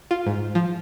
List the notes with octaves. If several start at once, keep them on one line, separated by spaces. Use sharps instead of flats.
F4
G#2
F3